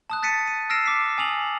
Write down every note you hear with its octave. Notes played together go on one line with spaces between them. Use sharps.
A5 D#6 F#6
F#6 A6 B6 C#7 D#7
D#7
E6 F6 A#6 C7 D7 E7
D6 B6
G#5 D#6 F7 F#7